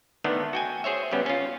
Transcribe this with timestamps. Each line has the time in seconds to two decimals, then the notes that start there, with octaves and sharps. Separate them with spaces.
0.24 D3 D#3 A3 B3 D4
0.53 F#4 G5 G#5
0.84 G#4 C5 C#5 E5
1.11 C#3 G3 B3 C#4
1.26 C#4 F4